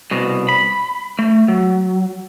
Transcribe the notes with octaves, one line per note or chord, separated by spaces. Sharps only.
C2 B2
B5
A3
F#3